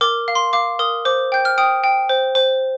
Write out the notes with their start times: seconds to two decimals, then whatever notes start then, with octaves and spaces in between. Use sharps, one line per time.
0.01 A#4 D6
0.28 F5
0.35 C6
0.53 F5 D6
0.79 A#4 D#6
1.05 C5 D6
1.32 G5 G6
1.45 F6
1.58 G5 D#6
1.84 G5
2.09 C5
2.35 C5